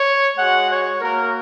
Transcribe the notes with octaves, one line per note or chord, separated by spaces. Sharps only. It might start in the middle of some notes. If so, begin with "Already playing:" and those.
Already playing: C#5
G#3 F#4 F#5
C#5
A#3 F#4 A#4